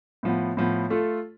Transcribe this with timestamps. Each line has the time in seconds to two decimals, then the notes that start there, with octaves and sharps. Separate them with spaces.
0.23 A2 F3 B3
0.57 A2 F3 B3
0.90 A3 F4 A4